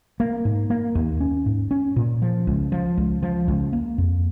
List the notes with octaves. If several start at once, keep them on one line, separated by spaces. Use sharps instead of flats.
A#3
G#2
A#3
D#2
C#4
G#2
C#4
A#2
F3
C#2
F3
C#2
F3
C#2
A#3
F2